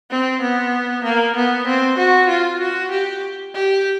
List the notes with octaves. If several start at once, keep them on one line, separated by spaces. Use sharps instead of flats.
C4
B3
A#3
B3
C4
F#4
F4
F#4
G4
G4